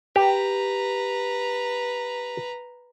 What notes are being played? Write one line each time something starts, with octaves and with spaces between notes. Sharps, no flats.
G4 B4 A#5